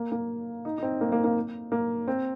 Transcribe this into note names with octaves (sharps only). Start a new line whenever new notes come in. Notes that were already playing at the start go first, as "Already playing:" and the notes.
Already playing: A#3
A#3
D#4
D#4
C4
A#3
A#3
A#3
A#3
C4